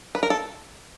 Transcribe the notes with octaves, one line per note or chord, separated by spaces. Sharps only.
B4
A#4
A4